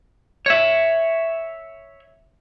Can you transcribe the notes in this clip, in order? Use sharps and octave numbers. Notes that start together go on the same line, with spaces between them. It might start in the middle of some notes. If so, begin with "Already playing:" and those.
C#5 E5